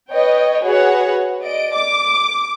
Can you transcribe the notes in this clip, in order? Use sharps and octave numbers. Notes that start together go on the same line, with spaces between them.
B4 C#5 D#5 G5
F#4 G#4 B4 C#5 F#5
D5 D#5 D7
D6